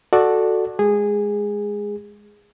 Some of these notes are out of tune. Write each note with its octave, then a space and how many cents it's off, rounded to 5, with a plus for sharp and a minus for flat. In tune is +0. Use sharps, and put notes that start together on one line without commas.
F#4 -5 A4 +0 D5 +15
G#3 +0 G#4 -15